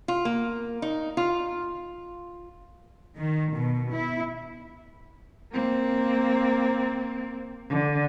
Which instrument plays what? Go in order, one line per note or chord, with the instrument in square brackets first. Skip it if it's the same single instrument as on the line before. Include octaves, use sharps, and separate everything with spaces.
[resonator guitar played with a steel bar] F4
A#3
D#4
F4
[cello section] D#3
B2
E4
[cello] A#3 C4
D3